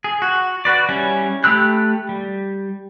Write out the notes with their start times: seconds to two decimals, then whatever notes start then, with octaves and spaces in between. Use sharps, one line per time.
0.04 G#4
0.22 F#4
0.65 F#4 B4 D5
0.89 G3 C#4 E4
1.44 A3 G4 B5 E6 F#6
2.09 G3